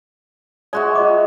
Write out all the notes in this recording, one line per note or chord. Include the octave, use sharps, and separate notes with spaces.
G#3 F#4 D5 E5
F4 D#5 D6